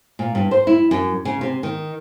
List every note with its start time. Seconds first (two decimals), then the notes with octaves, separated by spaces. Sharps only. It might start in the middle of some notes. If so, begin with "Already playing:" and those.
0.19 A#2
0.35 G2
0.51 C5
0.67 E4
0.91 F#2
1.25 C#3
1.41 C3
1.63 D#3